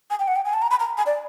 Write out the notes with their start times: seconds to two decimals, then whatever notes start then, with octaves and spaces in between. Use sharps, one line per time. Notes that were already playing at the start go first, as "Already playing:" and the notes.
0.10 G#5
0.19 G5
0.28 F#5
0.36 G5
0.45 G#5
0.54 A5
0.62 A#5
0.71 B5
0.79 A#5
0.97 G#5
1.06 D5